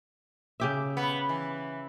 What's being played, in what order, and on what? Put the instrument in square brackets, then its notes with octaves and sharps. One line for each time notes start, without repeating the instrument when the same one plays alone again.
[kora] C#3 G4 E5
[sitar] B3
E3